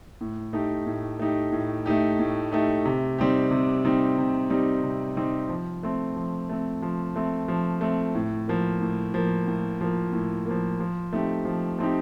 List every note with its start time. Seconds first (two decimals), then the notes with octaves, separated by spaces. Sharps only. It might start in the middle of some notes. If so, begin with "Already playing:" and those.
0.21 A2
0.53 A3 D#4 G4
0.86 A2
1.19 A3 D#4 G4
1.52 A2
1.86 A3 D#4 G4
2.19 A2
2.52 A3 D#4 G4
2.85 C3
3.18 G3 C4 D#4 G4
3.51 C3
3.85 G3 C4 D#4 G4
4.18 C3
4.50 G3 C4 D#4 G4
4.84 C3
5.16 G3 C4 D#4 G4
5.49 F3
5.83 A3 C4
6.16 F3
6.49 A3 C4
6.82 F3
7.16 A3 C4
7.48 F3
7.81 A3 C4
8.15 A2
8.48 F3 A#3
8.81 A2
9.14 F3 A#3
9.48 A2
9.81 F3 A#3
10.13 A2
10.46 F3 A#3
10.80 F3
11.13 A3 C4 D#4 G4
11.45 F3
11.78 A3 C4 D#4 G4